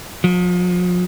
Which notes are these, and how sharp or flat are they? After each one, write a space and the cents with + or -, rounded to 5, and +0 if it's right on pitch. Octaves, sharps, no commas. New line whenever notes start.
F3 +40